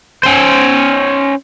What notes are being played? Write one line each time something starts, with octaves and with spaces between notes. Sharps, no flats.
C#4 C5